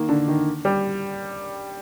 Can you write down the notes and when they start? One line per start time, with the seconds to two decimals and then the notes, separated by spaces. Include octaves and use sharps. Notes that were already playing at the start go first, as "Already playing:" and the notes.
Already playing: D#3 A#3
0.09 D3
0.28 D#3
0.65 G3